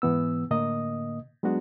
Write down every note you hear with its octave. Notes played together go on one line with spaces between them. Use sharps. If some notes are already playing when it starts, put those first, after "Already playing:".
G#2 E3 B3 E6
A2 D3 A#3 D#5 D#6
F#3 G#3 B3 D4 F#4